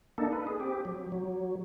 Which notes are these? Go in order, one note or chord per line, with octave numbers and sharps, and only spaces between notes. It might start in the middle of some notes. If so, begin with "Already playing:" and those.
A#3 D4 D#4 A4
B4
G#4
C4 G4
F#3
F#3